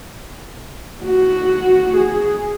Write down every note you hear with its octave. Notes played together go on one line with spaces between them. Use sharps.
F#4
G#4